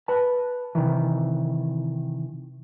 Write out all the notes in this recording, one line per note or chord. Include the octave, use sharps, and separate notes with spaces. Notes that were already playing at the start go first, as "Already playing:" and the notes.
B4 A5
C3 D#3 E3